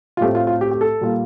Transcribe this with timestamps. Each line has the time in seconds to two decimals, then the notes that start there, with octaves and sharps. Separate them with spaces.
0.17 F4
0.21 A2 A3 C4 G4
0.35 F4
0.47 F4
0.61 G4
0.71 G4
0.81 A4
1.01 A#2 G3 A#3 F4